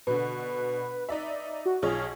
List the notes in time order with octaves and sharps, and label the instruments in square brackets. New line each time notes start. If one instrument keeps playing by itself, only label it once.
[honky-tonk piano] B2 D3 [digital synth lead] B4
[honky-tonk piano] D#4 D5 E5
[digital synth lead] F#4
[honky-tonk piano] B1 F4 C#5 [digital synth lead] G#4